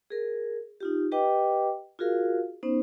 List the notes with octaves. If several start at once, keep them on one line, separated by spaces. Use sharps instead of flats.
G#4 A#4
D#4 F4 G4
G4 B4 D#5 G5 D6
F4 F#4 G#4 A#4 F5
B3 C#4 D#4 C5